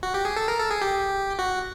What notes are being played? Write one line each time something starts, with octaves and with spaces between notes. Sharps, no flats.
F#4
G4
G#4
A4
A#4
A4
G#4
G4
F#4